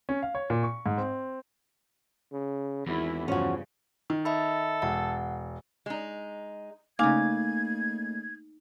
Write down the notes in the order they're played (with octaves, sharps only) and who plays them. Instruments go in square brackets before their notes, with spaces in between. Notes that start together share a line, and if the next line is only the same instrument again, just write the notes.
[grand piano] C#4
F5
C#5
A#2
C#6
G#2
C4
[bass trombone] C#3
[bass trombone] G#1 [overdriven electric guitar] E2 [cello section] E4
[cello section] G2 C#3 [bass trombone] F3 [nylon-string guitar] C#4 F#4
[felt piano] D#3
[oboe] A4 [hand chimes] D#5 E5 B5
[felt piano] E1 [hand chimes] F#5
[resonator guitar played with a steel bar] G#3 D#4
[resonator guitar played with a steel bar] C#3 F5 [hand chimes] A3 A#3 [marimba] D#4 G#5 D6 [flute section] G#6